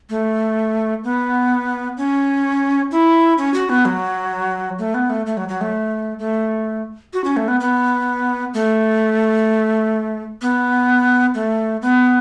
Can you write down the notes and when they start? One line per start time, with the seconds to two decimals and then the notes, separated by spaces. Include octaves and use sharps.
0.10 A3
1.04 B3
1.97 C#4
2.91 E4
3.38 C#4
3.54 F#4
3.69 B3
3.85 F#3
4.79 A3
4.94 B3
5.10 A3
5.26 A3
5.37 F#3
5.49 F#3
5.61 A3
6.19 A3
7.13 F#4
7.24 C#4
7.37 A3
7.48 B3
7.60 B3
8.54 A3
10.42 B3
11.34 A3
11.82 B3